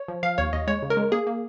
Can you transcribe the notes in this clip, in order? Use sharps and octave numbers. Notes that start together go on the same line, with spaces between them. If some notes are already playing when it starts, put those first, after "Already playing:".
Already playing: C#5
F3
F3 F5
D#2 C#5
D#2 D#5
G#3 C#5
C#3
A#4
G#3
A#3 G#4
A#3